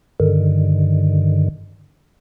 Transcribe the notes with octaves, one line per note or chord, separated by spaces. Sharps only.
G2 D3 D#3